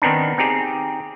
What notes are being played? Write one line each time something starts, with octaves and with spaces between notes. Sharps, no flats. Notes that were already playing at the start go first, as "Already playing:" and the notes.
D#3 B3 C4 D4 D#4
C4 D#4 G4 G#4